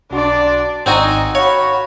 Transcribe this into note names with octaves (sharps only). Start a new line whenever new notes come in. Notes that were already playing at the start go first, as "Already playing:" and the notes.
B1 D4 F#4 D5 C6
G#1 C4 D#4 F#4 D5 F#5 G#5
F#4 C#5 F5 B5